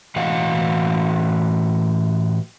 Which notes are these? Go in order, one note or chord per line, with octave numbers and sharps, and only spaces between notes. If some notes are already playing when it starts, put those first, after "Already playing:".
A2 E3 F#4 D#5 F5 F#5